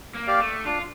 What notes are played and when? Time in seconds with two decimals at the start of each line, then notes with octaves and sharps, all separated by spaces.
0.15 A#3
0.27 G4 D5 F5
0.40 A3
0.65 D4 F4